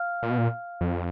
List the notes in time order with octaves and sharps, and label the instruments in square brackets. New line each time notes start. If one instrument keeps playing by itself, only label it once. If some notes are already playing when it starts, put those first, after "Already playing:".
Already playing: [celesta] F5 F6
[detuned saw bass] A#2
B2
A#2
F2